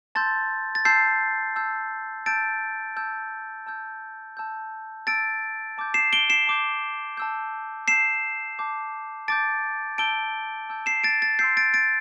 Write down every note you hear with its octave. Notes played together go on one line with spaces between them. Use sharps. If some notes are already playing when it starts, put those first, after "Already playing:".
A5 C6 E6 G6 A6
A6
A5 C6 E6 G6 C7
A5 E6 G6
A5 E6 G6 A6 D7
A5 E6 G6
A5 E6 G6
A5 E6 G6
A5 E6 G6 A6 D7
A5 D6 G6
C7 E7
D7 G7
C7 E7
A5 D6 G6
A5 E6 G6
A5 E6 G6 C7 E7
A5 D6 G6
A5 D6 G6 A6 D7
A5 E6 G6 D7 G7
A5 E6 G6
C7 E7
A6 D7
A6
C6 E6 G6 C7
A6 D7
A6 D7